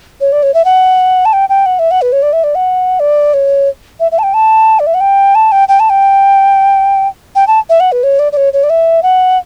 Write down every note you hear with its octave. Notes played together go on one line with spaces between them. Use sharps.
C#5
D5
C#5
E5
F#5
A5
G5
G5
F#5
E5
F#5
B4
C#5
D5
E5
D5
F#5
D5
C#5
E5
E5
A5
G5
A5
D5
E5
F#5
G5
A5
G5
G5
A5
G5
G5
A5
E5
F#5
B4
C#5
D5
D5
C#5
C#5
D5
E5
F#5